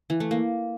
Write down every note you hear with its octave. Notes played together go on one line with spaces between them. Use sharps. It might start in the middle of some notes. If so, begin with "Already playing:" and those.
E3
A3
A#3